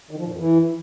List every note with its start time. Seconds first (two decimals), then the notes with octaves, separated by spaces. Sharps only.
0.11 D#3
0.18 F3
0.25 A#2
0.32 F2
0.39 E3